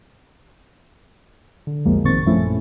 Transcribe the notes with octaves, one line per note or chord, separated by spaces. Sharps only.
D3
B1 F2 B2 F3 G#3 A#3
A1 A#2 D#3 C4 C#6 A6
F#2 A#2 F3 A3 C#4 E4